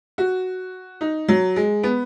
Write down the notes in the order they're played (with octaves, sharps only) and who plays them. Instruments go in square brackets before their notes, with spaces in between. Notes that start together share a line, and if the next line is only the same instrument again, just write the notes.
[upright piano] F#4
D#4
F#3
G#3
B3